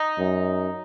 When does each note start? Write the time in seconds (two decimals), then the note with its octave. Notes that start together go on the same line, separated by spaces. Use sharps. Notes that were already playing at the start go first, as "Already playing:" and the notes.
Already playing: D#4
0.19 F#2